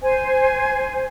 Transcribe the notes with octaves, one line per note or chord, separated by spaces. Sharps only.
C5 G#5